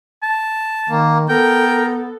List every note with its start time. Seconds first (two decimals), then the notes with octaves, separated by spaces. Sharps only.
0.23 A5
0.90 D#3 A#3
1.29 B3 A4 A#4 G5